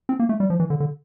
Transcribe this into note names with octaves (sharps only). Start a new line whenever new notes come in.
C4
A#3
A3
G3
F3
E3
D3
D3